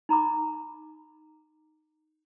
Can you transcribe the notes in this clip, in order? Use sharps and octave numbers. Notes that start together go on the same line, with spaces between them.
D#4 A#5 B5 D6